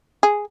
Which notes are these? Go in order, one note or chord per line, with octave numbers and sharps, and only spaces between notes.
G#4